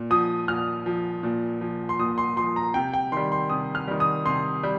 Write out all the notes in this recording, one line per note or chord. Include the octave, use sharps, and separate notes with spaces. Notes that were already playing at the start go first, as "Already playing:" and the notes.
Already playing: A#2
F3 D#6
A#2 F6
F3
A#2
F3
C6
A#2 D#6
C6
F3 C6
A#5
C3 G5
G5
D#3 G3 C6
C6
C3 D#6
F6
D#3 G3
D#6
C3 C6
G3